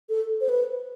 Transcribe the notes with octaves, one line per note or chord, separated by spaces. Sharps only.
A4
C5
B4